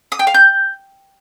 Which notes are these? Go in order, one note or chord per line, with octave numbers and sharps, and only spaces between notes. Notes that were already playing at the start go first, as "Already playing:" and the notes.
D#6
G5
F5
G6